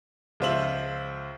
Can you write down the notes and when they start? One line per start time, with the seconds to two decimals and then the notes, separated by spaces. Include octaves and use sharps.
0.40 C#2 F3 F4 C5 E5 F#7